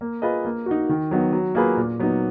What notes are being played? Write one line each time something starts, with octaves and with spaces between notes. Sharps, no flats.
A#3
F4 G#4 B4 D#5
A#3
D#4 F#4
D#3
F#3 B3 D#4
F#3
A#3 F4 G#4 B4
A#2
F#3 B3 D#4